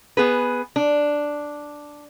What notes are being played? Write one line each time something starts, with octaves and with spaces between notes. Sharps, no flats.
B3 G#4 B4
D4